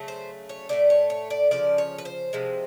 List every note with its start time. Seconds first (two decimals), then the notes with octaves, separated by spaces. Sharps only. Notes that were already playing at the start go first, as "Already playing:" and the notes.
Already playing: C#3 F#3 A3
0.08 C5
0.49 C#5
0.69 A2 F3 A3 D5
0.90 C#5
1.10 C#5
1.30 D5
1.51 C#3 F3 D5
1.78 C#5
1.98 B4
2.05 C5
2.33 C3 F3 G#3